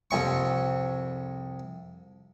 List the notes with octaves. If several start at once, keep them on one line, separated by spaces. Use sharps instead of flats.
C2 F2 C#6